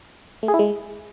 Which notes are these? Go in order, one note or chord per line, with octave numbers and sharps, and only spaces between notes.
A3
G#4
E4
G#3